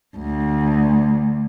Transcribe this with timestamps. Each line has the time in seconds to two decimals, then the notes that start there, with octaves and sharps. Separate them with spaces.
0.18 D2